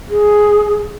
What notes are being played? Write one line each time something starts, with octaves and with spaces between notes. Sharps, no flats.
G#4